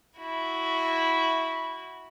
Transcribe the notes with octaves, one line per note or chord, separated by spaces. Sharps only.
E4 F#4